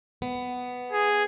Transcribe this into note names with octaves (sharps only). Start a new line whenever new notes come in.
B3
G#4